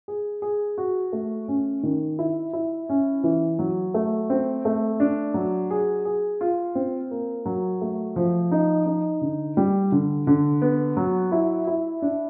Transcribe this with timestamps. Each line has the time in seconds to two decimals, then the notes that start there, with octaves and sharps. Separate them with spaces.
0.08 G#4
0.42 G#4
0.78 F#4
1.13 A3
1.48 C#4
1.83 D#3
2.19 E4
2.53 E4
2.89 C#4
3.24 E3
3.59 F#3
3.94 A3
4.30 C4
4.65 A3
5.00 D4
5.34 F#3
5.71 G#4
6.05 G#4
6.41 F4
6.75 C4
7.11 A#3
7.46 F#3
7.81 A3
8.16 F3
8.51 D#4
8.86 D#4
9.21 D3
9.57 G3
9.92 D3
10.27 D3
10.62 B3
10.97 F#3
11.32 E4
11.67 E4
12.02 D4